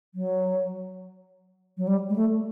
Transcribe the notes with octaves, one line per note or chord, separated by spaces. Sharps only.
F#3
F#3
G3
G#3
A3